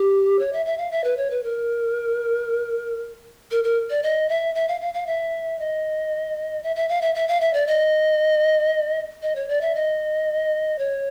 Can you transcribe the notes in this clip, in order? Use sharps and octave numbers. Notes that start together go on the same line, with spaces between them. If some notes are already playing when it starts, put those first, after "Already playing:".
Already playing: G4
C#5
E5
E5
F5
E5
B4
C#5
B4
A#4
A#4
A#4
D5
D#5
E5
E5
F5
F5
F5
E5
D#5
E5
E5
F5
E5
E5
F5
E5
D5
D#5
D#5
C#5
D5
E5
D#5
C#5